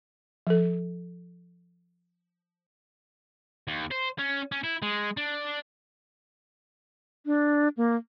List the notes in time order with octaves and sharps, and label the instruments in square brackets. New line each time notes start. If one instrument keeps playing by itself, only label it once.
[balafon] F3 A4
[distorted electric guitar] D#2
C5
C#4
C#4
E4
G#3
D4
[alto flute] D4
A#3